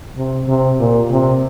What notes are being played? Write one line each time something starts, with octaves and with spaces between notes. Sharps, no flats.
C3
C3
A#2
C3